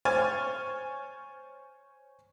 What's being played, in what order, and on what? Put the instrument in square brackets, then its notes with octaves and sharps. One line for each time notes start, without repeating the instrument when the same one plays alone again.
[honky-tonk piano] C5 C#5 G#5 F6 A6